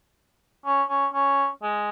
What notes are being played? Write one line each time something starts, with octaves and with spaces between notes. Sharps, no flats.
C#4
C#4
C#4
G#3